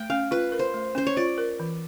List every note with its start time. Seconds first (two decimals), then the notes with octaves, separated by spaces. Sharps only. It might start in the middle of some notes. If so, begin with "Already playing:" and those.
Already playing: A3 G5
0.10 C#4 F5
0.31 F4 B4
0.52 A#4
0.59 C5
0.74 A3
0.95 C#4 C5
1.07 C#5
1.17 F4 D5
1.38 A#4
1.60 E3